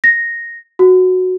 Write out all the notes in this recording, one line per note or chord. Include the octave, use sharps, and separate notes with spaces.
A#6
F#4